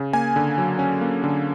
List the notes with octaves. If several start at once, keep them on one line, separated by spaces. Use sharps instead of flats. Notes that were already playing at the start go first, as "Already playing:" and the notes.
Already playing: C#3
A#3 G#5
D3
F#3
C#4
A#3
D3